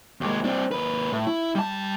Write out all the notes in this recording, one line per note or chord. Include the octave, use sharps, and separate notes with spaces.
D#2 G#3
C4 D4
D#2 B4
A2
E4
G3 A5